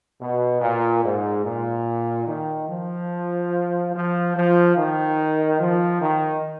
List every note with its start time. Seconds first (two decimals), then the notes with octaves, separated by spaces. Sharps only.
0.21 B2
0.61 A#2
1.04 G#2
1.45 A#2
2.27 D#3
2.69 F3
3.94 F3
4.35 F3
4.76 D#3
5.60 F3
6.01 D#3